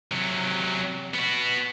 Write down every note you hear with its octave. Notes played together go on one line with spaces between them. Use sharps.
C3 F#3
B3 F#4